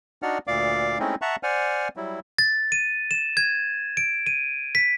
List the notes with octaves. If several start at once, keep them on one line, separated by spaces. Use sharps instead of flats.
D4 D#4 F#4 D5 F#5 F6
D2 A#2 D5 F5 D6
G#3 A3 C4 C#4 D#4 E4
E5 F#5 A5 A#5 C#6 F#6
C5 D5 F#5 G#5 F6
F#3 G3 E4
A6
D#7
E7
G#6
D7
D#7
B6